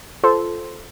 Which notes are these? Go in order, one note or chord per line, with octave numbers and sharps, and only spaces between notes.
F4 A4 C5 C6